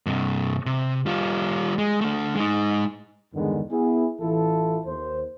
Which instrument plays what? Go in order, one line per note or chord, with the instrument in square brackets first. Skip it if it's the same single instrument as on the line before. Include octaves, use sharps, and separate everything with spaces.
[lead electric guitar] G2 C3
C3
G3 F4
G#3
A3 D4
G#3 D#4
[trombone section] E2 G2 D3 D#3 G#3 B3
B3 E4 G#4
A1 E3 E4 F4 A4
D#2 C5